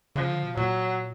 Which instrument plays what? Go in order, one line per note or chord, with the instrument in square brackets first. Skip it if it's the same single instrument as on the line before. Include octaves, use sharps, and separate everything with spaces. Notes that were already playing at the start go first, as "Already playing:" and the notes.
[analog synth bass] C#3 [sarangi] F3
[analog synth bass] D3
B2
[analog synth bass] A#2 [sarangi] F#3